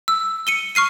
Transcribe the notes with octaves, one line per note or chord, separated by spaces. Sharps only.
E6
C#7 D#7 G7
C#6 F6 C7 D#7